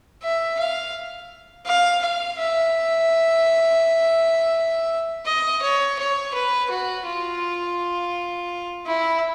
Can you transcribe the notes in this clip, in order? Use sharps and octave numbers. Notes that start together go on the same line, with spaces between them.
E5
F5
F5
F5
E5
D#5
C#5
C#5
B4
F#4
F4
E4